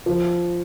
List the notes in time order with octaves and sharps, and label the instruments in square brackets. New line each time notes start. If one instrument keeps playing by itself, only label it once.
[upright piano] F3